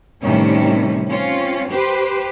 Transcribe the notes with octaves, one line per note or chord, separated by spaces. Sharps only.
A2 C3 D#3 E3 G3 C#4
C4 C#4 F4
G4 B4 C5